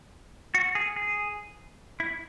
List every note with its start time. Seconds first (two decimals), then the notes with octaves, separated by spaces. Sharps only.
0.54 F#4
0.75 G#4
0.96 G#4
2.00 E4